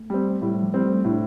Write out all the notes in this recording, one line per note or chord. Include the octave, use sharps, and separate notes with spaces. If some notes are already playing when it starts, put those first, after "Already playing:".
Already playing: A3
G3 C4
A2 G3
F3
G3 C4
A3
A2 D4